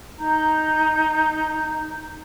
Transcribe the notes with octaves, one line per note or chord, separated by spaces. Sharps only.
D#4 A#5 G6